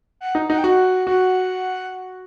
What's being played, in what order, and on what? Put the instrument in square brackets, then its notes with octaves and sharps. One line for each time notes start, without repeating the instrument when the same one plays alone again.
[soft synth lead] F#5
[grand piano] D#4
[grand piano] D#4 [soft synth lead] F#5
[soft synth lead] G5
[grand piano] F#4 [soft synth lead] F#5
[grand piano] F#4 [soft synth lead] F#5